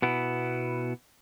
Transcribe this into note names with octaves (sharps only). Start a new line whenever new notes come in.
B2 B3 E4